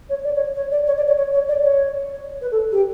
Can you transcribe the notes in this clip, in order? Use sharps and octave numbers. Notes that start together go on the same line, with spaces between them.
C#5
D5
C#5
C#5
D5
C#5
D5
C#5
C#5
C#5
D5
C#5
B4
A4
G4